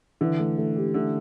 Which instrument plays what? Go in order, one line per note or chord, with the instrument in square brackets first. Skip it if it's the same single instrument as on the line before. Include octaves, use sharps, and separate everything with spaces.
[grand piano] D3 [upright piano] E3
[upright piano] A3
A3
G4
[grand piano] D3 [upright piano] A3